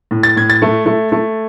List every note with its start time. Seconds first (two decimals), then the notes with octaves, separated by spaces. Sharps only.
0.11 A2
0.23 A6
0.36 A2 G#6
0.50 A6
0.62 A3
0.86 A3
1.12 A3